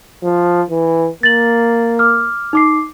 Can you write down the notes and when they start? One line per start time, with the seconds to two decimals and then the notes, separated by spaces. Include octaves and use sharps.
0.23 F3
0.70 E3
1.23 A#3 A6 F#7
1.99 D6 F6
2.53 D#4 D6 C7